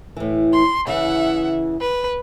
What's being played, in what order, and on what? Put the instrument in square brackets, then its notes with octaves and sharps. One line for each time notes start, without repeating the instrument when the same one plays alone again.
[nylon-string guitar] A2 E3
[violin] C6
[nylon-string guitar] C#3 E3 [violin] E5 F#5
[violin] B4